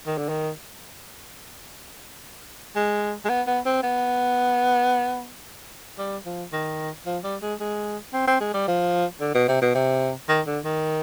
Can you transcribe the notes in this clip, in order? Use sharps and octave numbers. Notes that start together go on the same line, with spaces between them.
D#3
D3
D#3
G#3
G#3
B3
B3
C4
B3
G3
F3
D#3
F3
G3
G#3
G#3
C4
C4
G#3
G3
F3
D3
B2
C3
B2
C3
D#3
D3
D#3